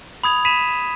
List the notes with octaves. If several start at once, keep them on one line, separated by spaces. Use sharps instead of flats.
B5 D#6 G#6 F7
B5 B6 D#7 E7